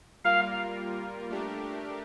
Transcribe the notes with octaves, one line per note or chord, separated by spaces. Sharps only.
G3 A#3 F4 A#4 F5
A3 D4 G4 A#4